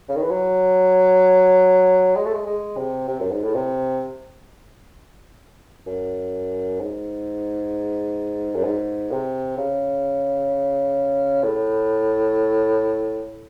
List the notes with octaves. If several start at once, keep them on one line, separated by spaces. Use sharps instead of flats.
C#3
D#3
E3
F#3
G#3
A3
G#3
G#3
C3
C3
F#2
G#2
A2
C3
F#2
G#2
F#2
G#2
C3
C#3
A2